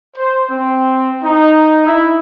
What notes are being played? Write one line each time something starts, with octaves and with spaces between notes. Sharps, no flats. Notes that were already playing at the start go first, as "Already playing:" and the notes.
C5
C4
D#4
E4